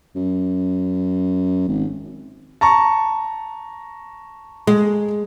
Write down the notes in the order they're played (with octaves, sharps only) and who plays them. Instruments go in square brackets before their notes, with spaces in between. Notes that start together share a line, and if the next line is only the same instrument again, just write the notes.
[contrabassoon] F#2
G#1
[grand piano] A5 A#5 C#6
[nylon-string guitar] G#3